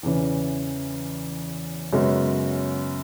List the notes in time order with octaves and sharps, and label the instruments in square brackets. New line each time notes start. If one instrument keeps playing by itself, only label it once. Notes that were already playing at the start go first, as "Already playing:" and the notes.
[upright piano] E2 C#3 E3
F#2 C#3 G#3 B3 F#4